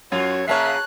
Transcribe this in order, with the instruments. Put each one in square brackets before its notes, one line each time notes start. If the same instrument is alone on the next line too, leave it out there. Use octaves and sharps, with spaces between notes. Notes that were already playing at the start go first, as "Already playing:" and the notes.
[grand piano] F#2 [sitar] F4 [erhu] F#4 [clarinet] C#5
[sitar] C#3 A#3 G#4 [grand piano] C#5 A5 C7 [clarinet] E5 [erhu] F#6